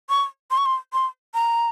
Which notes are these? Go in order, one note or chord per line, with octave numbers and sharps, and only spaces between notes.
C#6
C6
C#6
C6
C6
A#5